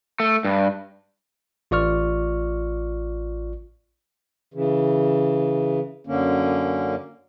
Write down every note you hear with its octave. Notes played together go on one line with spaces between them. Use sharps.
A3
G2
A1 F4 D5 C#6 F6
C#3 E3
F#2 D3 A#3 C#4